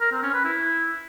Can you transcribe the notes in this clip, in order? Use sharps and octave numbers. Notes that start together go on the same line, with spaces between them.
A#4
C4
C#4
B4
E4